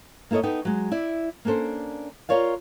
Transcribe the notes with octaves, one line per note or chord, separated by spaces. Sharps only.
A#3 E4 A4 C#5 D#5
B3 D#4 A4 G5
F#3 G#3
E4 D5 E5
A#3 C#4 D4 A4 C5
F4 G#4 A#4 C#5 D5 F5